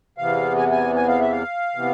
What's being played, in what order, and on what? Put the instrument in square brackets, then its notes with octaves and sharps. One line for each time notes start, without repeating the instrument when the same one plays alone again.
[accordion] E2 C3 E3 B3 F5
G#5
G#5
G#5
F5
E5
F5
C3 E3 B3